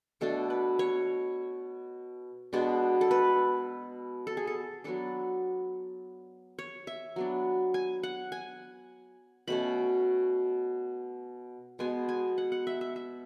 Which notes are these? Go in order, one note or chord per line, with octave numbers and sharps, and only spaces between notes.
B2 A3 D4 A4
B4
C#5
B2 G#3 B3 D4
A4
B4
A4
G#4
A4
F#3 B3 D4 A4
C#5
E5
F#3 B3 D4
G#5
F#5
G#5
B2 A3 C#4 B5
B2 G#3 B3 G#5
G#5
F#5
F#5
E5
E5
E5